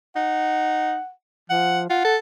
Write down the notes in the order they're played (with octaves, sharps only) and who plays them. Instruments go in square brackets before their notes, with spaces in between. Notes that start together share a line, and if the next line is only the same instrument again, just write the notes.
[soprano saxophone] D#4 [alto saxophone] F#5
[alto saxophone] F3 [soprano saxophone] F#5
[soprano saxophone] F4 [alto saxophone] F#5
[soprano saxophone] A4